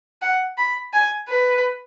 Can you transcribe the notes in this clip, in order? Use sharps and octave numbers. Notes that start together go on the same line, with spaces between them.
F#5
B5
G#5
B4